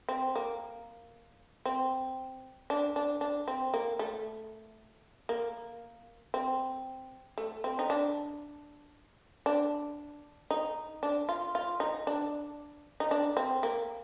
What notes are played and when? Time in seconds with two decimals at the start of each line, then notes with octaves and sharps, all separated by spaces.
0.09 C4
0.36 A#3
1.66 C4
2.70 D4
2.96 D4
3.21 D4
3.48 C4
3.74 A#3
3.99 A3
5.29 A#3
6.34 C4
7.38 A3
7.64 C4
7.79 D#4
7.90 D4
9.46 D4
10.51 D#4
11.03 D4
11.29 F4
11.55 F4
11.80 D#4
12.07 D4
13.00 D#4
13.11 D4
13.37 C4
13.63 A#3